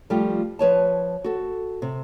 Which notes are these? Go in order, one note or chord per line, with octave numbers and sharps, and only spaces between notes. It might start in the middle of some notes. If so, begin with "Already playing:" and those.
F3 G3 A3 F4 G4
F3 B4 C#5 A5
F#4 A4
C3